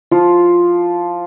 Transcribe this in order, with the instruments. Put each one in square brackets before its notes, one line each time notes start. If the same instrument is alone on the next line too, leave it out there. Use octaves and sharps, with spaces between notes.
[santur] F3 F4